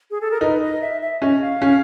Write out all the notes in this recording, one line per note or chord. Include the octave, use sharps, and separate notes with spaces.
G#4
A4
A#4
D#4 B4
D#5
E5
E5
C#4 D#5
F5
C#4